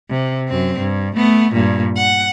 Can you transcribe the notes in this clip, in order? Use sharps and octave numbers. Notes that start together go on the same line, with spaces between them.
C3
F#2 C4
G2
A3 B3
G2 A#2
F#5